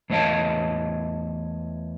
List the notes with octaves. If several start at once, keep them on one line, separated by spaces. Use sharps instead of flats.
E2 A3 C#5 D#5 F5 A5